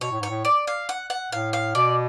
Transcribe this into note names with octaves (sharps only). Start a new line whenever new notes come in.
B2 C#5
A2
G#2 C#5
A2
D5
F5
F#5
F#5
A2 F5
F5
B2 D5